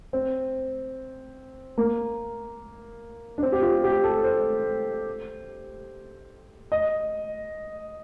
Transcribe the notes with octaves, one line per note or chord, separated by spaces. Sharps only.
C4
A#3
D4
C4
G4
F4
G4
A4
C5
D#5